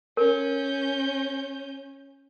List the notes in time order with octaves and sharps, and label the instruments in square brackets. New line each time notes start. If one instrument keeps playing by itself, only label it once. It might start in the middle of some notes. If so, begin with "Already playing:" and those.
[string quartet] C#4 G6 [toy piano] A#4